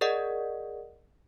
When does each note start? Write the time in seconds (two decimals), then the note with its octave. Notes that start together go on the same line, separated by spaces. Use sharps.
0.01 G#4 A#4 D5 D#5 F#5